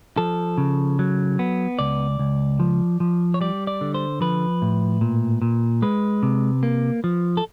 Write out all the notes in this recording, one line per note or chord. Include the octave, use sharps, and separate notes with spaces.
F3 A4
C#3
F#3
B3
C#2 D5
C#2
F3
F3
C#5
G3 D5
D5
D3
C5
F3 B4
A2
A#2
A#2
G#3 B4
C3
A#3
F3
A4